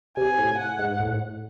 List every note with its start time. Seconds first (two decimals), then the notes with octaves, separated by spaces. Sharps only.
0.17 C3 G#5
0.38 A2
0.58 F#5
0.79 G#2
1.00 A2